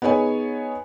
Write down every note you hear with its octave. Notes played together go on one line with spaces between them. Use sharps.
B3 D#4 G#4 C#5 G#5